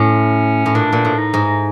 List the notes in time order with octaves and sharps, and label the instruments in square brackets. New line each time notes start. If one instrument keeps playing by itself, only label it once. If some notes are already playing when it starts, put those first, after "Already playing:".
Already playing: [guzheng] A2 [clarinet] C#4
[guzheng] A2
[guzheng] A#2 [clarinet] D4
[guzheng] A#2
A2
[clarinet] D#4
[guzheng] G#2